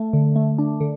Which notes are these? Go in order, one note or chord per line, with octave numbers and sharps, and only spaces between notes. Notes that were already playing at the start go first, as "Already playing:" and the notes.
Already playing: A3
D3
A3
D4
D3